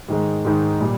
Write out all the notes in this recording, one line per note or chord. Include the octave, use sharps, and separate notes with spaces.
G#2 D#3 G#3 D#4
G#2 D#3 G#3 D#4
A#2 G3